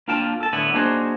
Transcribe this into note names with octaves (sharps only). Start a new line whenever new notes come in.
A#3 D4 F4 F5 G5 A5
A4 A5
A2 D3 B3 E4
A#3 D4 D#4 F#4 G#4 C5